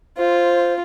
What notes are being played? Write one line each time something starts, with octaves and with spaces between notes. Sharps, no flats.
F4 C5